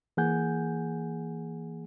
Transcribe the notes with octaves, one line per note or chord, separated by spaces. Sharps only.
E3 A#3 G#4 F#5 G#5 G6